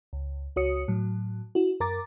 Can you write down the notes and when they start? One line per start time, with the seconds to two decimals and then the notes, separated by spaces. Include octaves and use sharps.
0.13 C#2
0.56 C#2 F#4 C#5 D#6 C#7
0.88 A2 F#3
1.55 E4 F#4
1.80 F#2 A#4 A#5 D6 A6